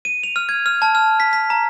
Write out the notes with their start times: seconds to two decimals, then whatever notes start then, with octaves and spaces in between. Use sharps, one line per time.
0.05 D#7
0.23 F7
0.36 F6
0.49 G#6
0.66 F6
0.82 A5
0.95 F6
1.20 B6
1.33 B6
1.50 A#5